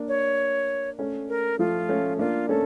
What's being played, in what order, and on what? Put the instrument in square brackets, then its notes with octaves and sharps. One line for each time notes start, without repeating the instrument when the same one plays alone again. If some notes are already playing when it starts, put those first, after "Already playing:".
Already playing: [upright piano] A#3 D4
[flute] C#5
[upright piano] A3 C#4
[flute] A#4
[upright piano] F3 A3 [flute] F4
[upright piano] A3 C#4
[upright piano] A#3 D4 [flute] F4
[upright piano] A3 C#4 [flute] A4